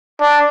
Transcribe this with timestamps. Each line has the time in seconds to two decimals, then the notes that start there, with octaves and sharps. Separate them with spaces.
0.21 D4